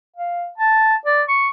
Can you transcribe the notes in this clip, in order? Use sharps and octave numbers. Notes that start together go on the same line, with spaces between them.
F5
A5
D5
C#6